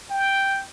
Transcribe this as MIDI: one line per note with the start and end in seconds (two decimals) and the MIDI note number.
0.10 0.63 79